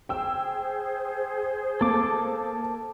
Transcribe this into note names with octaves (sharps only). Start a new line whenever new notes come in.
G#4 C5 G5 E6
A#3 A4 A5 D6